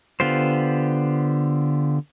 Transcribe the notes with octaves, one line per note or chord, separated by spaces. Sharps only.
D3 B3 F4 G4 C5